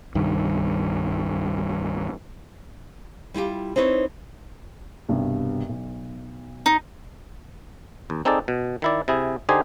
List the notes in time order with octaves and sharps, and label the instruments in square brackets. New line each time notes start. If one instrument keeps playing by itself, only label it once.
[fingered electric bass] C2 G2 D#3
[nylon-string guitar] G3 E4 F4 G4
C4 D#4 E4 B4 C#5
[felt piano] C2 G2 B2
B1
[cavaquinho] D#4
[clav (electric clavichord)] D#2
C4 D#4 G#4 A4 D5
B2
D#3 E4 D5
C3 E4 G#4
D3 D#4 G4 G#4 C5 G#5